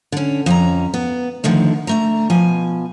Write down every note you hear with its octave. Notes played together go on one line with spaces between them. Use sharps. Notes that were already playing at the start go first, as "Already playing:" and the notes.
D3 C#4
F2 C#4 A#5
B3
D3 D#3 F3 A3
D3 A3 A#5
B2 F3 G#5